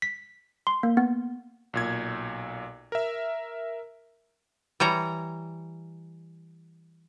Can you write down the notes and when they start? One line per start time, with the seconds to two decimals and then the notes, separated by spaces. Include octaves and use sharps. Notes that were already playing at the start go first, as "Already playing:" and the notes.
0.02 B6
0.67 C6
0.83 A#3
0.97 B3
1.73 B1 A#2 G#6
2.92 A#4 E5
4.80 E3 G3 C#5 A#5